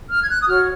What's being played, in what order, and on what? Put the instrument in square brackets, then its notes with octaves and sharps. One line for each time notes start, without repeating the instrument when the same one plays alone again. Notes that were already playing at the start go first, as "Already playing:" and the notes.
[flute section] F6
G#6
F#6
D#6
F#4 C#5 F6